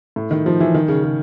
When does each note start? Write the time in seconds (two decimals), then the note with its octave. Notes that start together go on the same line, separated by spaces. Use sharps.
0.16 A2
0.31 D#3
0.46 F3
0.60 E3
0.74 D#3
0.88 C#3
1.04 C#3